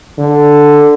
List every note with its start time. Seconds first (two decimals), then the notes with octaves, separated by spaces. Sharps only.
0.19 D3